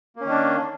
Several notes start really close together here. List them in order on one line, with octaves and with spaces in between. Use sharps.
A#3 C#4 D#3 D4